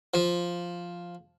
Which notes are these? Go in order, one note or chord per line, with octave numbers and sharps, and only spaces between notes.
F3